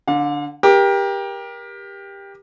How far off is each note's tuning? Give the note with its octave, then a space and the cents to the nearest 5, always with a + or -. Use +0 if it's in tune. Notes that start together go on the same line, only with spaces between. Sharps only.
D3 +0 F5 +45
G4 +15 A#4 +30